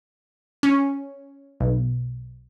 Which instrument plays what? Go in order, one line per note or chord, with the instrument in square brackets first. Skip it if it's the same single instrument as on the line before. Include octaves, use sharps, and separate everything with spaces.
[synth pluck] C#4
B1